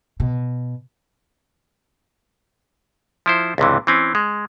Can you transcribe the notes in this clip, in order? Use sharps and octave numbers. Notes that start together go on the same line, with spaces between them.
B2
F3 E4 C5
C#2 G2 C3 E3
E3 C4 C#4
G#3